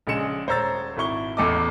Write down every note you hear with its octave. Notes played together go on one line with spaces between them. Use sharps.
A#1 C#3 G#3 C#7 E7
D#1 C5 C#5 A#5 E6 A6
G#1 E4 C#6 G7
A1 E2 A4 D#5 D6